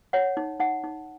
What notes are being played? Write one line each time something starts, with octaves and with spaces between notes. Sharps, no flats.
C#5 F#5
D#4
D#4 F#5
D#4